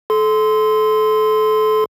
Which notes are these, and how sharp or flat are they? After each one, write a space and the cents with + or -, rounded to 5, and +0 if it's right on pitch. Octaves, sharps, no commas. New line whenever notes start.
A4 -30 C6 -15